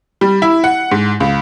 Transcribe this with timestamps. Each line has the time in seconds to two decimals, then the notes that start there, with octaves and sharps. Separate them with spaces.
0.21 G3
0.42 E4
0.64 F#5
0.91 G#2
1.20 C#2